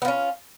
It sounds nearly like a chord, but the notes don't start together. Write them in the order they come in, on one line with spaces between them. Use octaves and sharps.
B3 F4 C#4